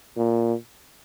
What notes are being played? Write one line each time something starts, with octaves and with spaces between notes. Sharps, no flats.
A#2